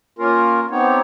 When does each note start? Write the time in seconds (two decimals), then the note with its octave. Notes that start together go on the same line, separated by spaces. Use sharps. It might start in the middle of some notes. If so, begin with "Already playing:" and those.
0.19 A#3 C#4 F4 A#4
0.71 B3 C4 D#4 G4 C#5